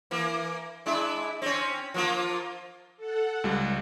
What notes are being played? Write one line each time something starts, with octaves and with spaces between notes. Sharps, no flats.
E3 A#3
G#3 D4 E4
C4 C#4
F3 A#3 F4
A4 F#5
C#2 G3